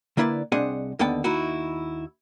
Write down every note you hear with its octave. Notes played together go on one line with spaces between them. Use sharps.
D3 A#3 E4 B4 C5 D5
C2 C4 D4 G#4 D#5 F#5
D#2 D3 D#3 B3 G5 A5
D#2 D#4 E4 F#4